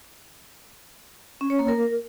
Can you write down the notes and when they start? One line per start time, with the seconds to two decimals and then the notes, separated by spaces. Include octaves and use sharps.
1.41 C#4
1.50 C#5
1.59 A#3
1.68 A#4